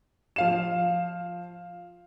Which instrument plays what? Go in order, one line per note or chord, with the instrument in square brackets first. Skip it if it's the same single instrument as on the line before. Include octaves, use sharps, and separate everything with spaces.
[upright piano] F3 F5 E7